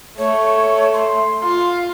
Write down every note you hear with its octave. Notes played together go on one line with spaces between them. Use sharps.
A3 C#5
C6
F4